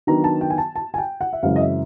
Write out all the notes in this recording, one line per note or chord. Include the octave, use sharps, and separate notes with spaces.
D#3 F#3 B3 D4 A#5
A5
G5
G#5
A5
A5
G#5
G5
F#5
E5
F#2 C#3 E3 G#3 C4 F5
D#5
E5